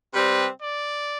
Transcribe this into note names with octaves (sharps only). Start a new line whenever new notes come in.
C3 G3 C4 B4
D5